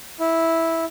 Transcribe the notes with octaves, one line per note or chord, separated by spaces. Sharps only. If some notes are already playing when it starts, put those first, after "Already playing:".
E4